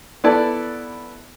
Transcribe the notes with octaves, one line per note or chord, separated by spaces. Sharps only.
B3 E4 A4 D5 A5